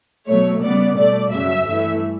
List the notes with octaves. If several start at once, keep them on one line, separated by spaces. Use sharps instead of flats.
B2 F#3 A3 C#5
C#3 G3 B3 D5
B2 A3 D5
F#2 C#3 F#3 E5
G2 E3 A3